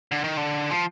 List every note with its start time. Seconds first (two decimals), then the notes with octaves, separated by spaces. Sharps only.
0.12 D3
0.24 D#3
0.37 D3
0.71 F3